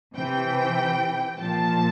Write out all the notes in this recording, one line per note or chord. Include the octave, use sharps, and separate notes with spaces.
C3 E3 G5
A#2 F3 A5